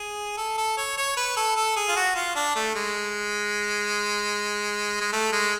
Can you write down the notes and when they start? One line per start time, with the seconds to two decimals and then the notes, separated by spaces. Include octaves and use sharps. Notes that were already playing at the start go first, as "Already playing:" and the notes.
Already playing: G#4
0.37 A4
0.58 A4
0.77 C#5
0.97 C#5
1.17 B4
1.37 A4
1.57 A4
1.76 G#4
1.88 F4
1.96 F#4
2.15 F4
2.35 D4
2.55 A3
2.75 G#3
5.01 G#3
5.12 A3
5.32 G#3